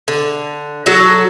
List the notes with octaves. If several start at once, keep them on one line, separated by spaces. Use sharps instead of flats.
D3
F#3 F#4 A4